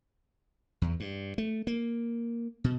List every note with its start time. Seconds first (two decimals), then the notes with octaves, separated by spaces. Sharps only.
0.82 E2
1.00 G2
1.38 A3
1.67 A#3
2.64 B2